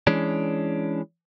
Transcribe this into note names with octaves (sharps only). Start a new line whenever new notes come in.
E3 G#3 C#4 D4